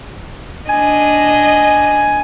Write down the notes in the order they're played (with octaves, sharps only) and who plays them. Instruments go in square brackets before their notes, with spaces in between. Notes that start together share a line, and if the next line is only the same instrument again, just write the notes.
[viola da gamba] D4 D#5 [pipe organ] G#5